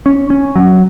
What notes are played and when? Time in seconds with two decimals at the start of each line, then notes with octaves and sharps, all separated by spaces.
0.06 C#4
0.30 C#4
0.56 F#3